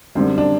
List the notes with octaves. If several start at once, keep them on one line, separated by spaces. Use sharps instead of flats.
F#2 D3 G3 C4
D4